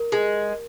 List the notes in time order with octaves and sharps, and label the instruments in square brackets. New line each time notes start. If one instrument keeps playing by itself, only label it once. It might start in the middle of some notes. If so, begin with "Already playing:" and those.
Already playing: [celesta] A#4
[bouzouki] G#3